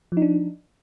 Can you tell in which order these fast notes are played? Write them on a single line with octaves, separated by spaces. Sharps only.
F3 D#4 D4